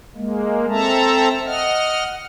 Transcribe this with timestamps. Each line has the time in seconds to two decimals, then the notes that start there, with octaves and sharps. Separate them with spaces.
0.16 G#3 A#3
0.70 C4 A4 E5 A5 A#5
1.46 D#5 F#5 F6